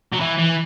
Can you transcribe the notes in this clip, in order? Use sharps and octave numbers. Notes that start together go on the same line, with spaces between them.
F#3
E3
E3